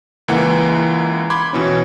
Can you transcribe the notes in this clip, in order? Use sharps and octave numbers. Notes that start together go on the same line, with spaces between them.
C#2 E3 A#3 F#5
B5 C6 D6 G#6
B2 E3 C#4